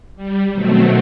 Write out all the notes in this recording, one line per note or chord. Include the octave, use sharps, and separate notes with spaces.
G3
B2 D#3 F#3 A3 C4